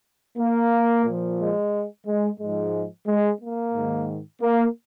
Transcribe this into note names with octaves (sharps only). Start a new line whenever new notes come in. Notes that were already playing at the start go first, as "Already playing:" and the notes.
A#3
A#2 F3
G#3
G#3
G#2 F3 G#3
G#3
A#3
G#2 D#3
A#3